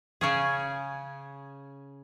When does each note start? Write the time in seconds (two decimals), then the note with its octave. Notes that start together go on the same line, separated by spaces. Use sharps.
0.21 C#3 C#4 G#4